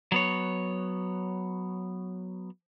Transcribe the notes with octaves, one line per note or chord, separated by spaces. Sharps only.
F#3 B3 C#5